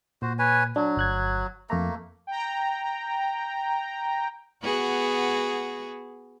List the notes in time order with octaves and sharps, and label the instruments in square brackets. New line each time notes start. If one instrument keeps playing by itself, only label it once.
[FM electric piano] A#2 [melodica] F#4 C5
[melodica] B4 C#5 G#5
[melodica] F#3 [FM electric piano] D4
[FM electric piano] G1 F#6 G#6
[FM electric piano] F2 A#5 [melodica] A3 A#3
[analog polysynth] G5 A#5
[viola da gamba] B3 F#4 G#4